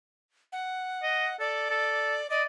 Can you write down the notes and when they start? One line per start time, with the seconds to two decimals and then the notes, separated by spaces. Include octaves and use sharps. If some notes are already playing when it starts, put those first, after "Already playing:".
0.52 F#5
1.03 D#5
1.40 A4 D5
1.71 A4
2.30 D5 D#5